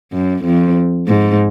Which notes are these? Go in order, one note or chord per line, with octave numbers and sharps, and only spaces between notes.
F#2
F2
G#2